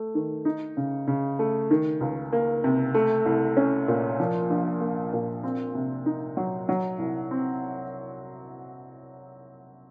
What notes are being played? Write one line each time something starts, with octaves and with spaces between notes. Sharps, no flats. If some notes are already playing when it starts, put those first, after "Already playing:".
Already playing: A3
D#3
D#4
C#3
C#3
A3
D#3
C#2
A#3
C3
A3
C2
C#4
A#2
F3
A#1
A#3
A#2
C4
C3
D#4
F#3
F#3
C2
C4